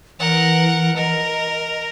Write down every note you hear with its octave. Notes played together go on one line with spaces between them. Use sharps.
E3 A#4 F#5
A#4 D#5